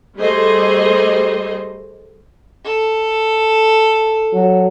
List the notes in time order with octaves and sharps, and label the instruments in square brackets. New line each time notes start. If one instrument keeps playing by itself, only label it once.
[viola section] G3 A3 G#4 C5 D#5
[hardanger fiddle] A4
[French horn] F#3